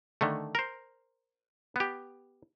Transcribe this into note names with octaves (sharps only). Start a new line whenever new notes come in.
D3 D#3 A3
A#4 C5
B3 G4